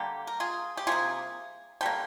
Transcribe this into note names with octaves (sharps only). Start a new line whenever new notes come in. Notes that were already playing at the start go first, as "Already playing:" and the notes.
Already playing: D3 G3 A#3 G4
A#4
F4 G#4
G4
C3 G3 A#3 F4 G#4
D3 G3 A#3 G5